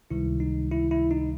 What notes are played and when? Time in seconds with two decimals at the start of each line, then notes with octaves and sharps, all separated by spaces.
0.11 C#2 C3 D#3 G3 E4
0.40 D#4
0.71 E4
0.91 E4
1.11 D#4